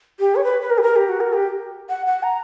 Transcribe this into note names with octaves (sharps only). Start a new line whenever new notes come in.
G4
C#5
B4
B4
A#4
G4
A#4
G4
F#4
A#4
G4
F#5
F#5
A#5